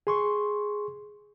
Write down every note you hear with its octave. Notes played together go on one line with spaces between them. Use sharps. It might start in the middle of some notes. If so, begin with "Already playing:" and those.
G#4 C6 C#6